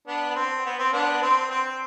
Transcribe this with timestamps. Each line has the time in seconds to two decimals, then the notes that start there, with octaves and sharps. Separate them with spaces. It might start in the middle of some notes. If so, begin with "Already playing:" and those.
0.07 B3 D4
0.30 B3
0.36 C4
0.66 B3
0.79 C4
0.93 B3 D4
1.22 C4
1.50 C4